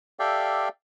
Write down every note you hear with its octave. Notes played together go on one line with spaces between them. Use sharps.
G4 A4 D5 E5 F5 G5